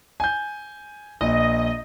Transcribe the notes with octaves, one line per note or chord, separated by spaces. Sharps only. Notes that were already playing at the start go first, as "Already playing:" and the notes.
G#5 G6
A#1 D#5